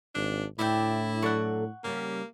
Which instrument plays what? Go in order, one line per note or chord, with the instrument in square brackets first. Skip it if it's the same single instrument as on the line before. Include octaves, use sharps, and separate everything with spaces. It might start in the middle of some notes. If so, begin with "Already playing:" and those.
[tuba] G#1 [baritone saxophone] D4
[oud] D2 [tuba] A2 [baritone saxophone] E4 [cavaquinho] D5 E5 G5
[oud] F#3 A4 D5 [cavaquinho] F#5 C#6
[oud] C#3 G3 C#4 [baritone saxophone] A#3